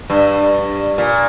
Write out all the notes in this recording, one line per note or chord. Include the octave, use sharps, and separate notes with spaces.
G2
A#2